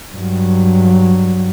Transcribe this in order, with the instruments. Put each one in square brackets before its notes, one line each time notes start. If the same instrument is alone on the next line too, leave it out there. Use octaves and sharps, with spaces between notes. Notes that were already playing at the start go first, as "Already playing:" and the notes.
[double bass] G2 F#3